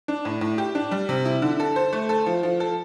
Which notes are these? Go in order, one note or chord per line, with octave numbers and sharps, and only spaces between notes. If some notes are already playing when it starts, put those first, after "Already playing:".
D4
A2
A2
G4
D4
G3
C3
E4
D3
A4
C5
A3
A4
F3
F3
A4